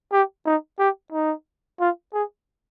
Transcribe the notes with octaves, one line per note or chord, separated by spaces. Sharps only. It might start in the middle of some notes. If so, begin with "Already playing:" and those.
G4
D#4
G4
D#4
F4
G#4